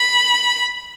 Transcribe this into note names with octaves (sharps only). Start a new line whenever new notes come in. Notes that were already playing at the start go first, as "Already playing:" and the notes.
Already playing: B5